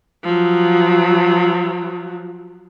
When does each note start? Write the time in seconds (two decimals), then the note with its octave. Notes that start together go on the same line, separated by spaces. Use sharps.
0.24 F3 F#3